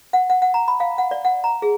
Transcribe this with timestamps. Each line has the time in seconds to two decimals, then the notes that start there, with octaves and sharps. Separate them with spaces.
0.13 F#5
0.30 F#5
0.42 F#5
0.54 A#5
0.68 B5
0.80 F5
0.98 F#5
1.11 D5
1.25 F#5
1.44 A#5
1.62 G#4